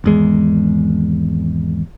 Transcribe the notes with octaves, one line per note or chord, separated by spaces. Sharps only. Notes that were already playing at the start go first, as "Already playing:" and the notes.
G#1 E2 G#3